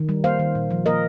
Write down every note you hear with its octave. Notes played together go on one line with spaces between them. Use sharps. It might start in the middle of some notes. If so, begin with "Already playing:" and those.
Already playing: D#3
G3
A#3 C5 F5
D#3
A#2
F3
A#3 A#4 D#5